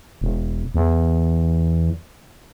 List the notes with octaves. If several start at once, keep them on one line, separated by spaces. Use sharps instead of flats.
E1
E2